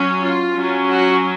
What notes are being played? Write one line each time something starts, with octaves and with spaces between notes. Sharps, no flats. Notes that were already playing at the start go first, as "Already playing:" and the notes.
Already playing: F#3 C#4
F4
F#3 C#4
F#4